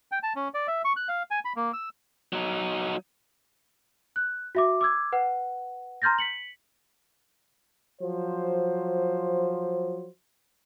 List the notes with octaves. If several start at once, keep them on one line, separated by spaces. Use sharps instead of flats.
G5
A5
C#4
D5
E5
C#6
F#6
F5
G#5
B5
A#3
E6
F#3 D#4
F#6
F#4 E5 D6
D6 E6 G#6
B4 F#5
A#5 C6 F6 G6 A6 A#6
B6 C#7 F#7
F3 F#3 C5